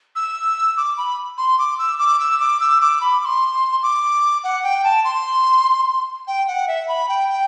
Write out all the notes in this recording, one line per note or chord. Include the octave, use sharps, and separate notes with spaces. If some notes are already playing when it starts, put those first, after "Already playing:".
E6
D6
B5
C6
D6
E6
D6
E6
D6
E6
D6
B5
D6
C6
D6
F#5
G5
A5
C6
G5
F#5
E5
B5
G5
G5